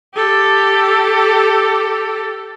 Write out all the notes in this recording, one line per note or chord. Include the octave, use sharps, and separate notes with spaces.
G4 A4